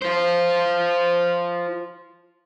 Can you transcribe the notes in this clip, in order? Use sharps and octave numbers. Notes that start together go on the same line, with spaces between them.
F4 C5